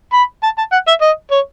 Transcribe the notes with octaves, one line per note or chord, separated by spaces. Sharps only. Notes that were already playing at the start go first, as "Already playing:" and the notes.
B5
A5
A5
F#5
E5
D#5
C#5